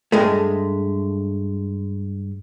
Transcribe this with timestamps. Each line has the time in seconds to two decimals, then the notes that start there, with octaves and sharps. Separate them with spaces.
0.12 G2 G#3 A3